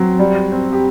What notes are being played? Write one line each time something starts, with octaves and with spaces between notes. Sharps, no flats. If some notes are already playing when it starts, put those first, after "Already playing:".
Already playing: F#3 C4
G3
C4
G4